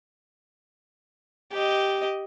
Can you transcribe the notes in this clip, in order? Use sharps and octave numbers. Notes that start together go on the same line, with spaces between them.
G4 D#5